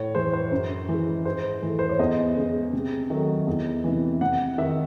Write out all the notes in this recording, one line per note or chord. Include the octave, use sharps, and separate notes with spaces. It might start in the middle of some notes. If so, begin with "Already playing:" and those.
Already playing: A2 C#5
E3 G#3 C5
C5
F#2
E3 G#3
G#2 C5
E3 A3
C5
C#5
E2 D#5
C#3 G#3
C3
D#3 F#3 A3
E2
C3 E3
C3 F#5
D#3 G#3 E5